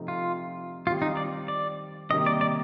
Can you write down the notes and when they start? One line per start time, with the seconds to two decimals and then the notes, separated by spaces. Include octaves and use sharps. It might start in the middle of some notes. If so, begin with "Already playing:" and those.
Already playing: C3 F3 A3 C4 D#4
0.08 F4
0.86 D#3 G3 C4 F4 G4
1.02 D#4
1.17 D5
1.48 D5
2.10 C3 D#3 G3 A#3 D#4 D#5
2.26 D5
2.41 D5